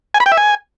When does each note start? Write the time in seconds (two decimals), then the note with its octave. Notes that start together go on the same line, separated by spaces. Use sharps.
0.14 G#5
0.20 B5
0.26 G5
0.32 E5
0.37 G#5